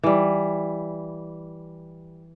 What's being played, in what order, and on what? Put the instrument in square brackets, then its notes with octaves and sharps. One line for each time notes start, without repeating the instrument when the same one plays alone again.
[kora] E3 G3